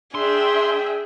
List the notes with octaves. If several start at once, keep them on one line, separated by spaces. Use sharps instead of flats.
D4 G#4 E5 G5 C6